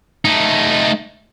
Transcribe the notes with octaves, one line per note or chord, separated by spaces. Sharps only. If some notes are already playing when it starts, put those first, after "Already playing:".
A3 D#4